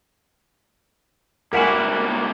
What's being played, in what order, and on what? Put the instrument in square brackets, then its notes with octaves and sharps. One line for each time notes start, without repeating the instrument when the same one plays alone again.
[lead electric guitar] C#2 A#3 [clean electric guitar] G3 E4 F#4 [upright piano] A#4 F#5 G#5